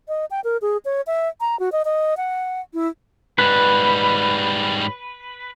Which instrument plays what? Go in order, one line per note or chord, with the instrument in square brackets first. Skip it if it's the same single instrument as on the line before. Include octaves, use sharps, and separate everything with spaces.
[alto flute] D#5
G5
A#4
G#4
C#5
E5
A#5
F#4
D#5
D#5
F#5
E4
[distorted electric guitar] G#2 G3 [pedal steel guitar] B4